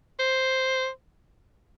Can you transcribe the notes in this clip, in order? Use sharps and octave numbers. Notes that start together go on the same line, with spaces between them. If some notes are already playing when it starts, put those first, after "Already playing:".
C5